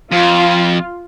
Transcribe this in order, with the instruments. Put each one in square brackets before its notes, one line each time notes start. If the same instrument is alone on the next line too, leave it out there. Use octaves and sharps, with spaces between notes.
[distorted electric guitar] F2 [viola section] F4